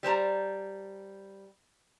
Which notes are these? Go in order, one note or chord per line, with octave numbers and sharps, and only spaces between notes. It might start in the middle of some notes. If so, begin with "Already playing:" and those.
G3 C5 A5 A#5